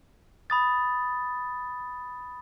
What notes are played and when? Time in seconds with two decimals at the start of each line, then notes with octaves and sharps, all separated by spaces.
0.50 B5 D#6 A6